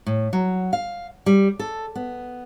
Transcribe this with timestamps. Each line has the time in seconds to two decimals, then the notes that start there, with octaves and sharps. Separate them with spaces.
0.06 A2
0.33 F#3
0.73 F5
1.26 G3
1.59 A4
1.95 B3